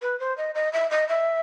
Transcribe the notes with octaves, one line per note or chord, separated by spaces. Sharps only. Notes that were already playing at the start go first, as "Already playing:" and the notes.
B4
C5
D#5
D#5
E5
D#5
E5